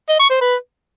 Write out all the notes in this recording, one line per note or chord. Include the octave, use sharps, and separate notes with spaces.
D#5
C#6
C5
B4